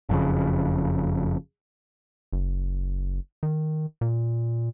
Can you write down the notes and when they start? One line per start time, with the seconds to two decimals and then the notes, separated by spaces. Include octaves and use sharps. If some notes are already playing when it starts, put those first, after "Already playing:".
0.09 F#1 F2 C#3
2.33 F#1
3.43 D#3
4.01 A#2